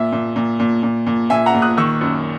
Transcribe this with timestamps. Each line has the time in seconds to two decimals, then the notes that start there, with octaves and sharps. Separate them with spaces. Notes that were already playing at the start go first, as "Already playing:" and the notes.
Already playing: A#2 E5
0.12 A#2
0.36 A#2
0.60 A#2
0.83 A#2
1.07 A#2
1.30 A#2 E5 G#5
1.46 F#5 A#5
1.54 A#2
1.62 D#6 F#6
1.77 D#3 C#6 E6
2.01 F#2